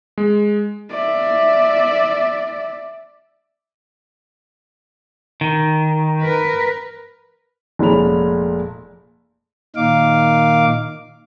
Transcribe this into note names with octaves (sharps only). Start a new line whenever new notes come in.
G#3
D5 E5
D#3
A#4 B4
F1 A#2 G#3 C#4 B5 F7
A#2 D#3 D#4 F5 D6